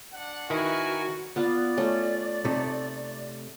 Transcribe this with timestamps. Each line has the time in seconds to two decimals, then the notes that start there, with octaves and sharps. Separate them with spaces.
0.13 D4 F#5
0.50 D#3 E4 F#4 A#4 B4 G#5
1.36 B3 F4 D5 F#5
1.77 A3 C#4
2.45 C3 A3 D#4